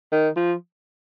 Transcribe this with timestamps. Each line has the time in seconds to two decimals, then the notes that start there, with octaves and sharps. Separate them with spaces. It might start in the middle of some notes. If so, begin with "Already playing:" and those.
0.12 D#3
0.36 F3